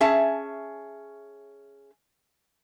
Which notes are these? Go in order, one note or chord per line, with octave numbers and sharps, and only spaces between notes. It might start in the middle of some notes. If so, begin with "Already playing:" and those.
C#4 G#4 E5 A5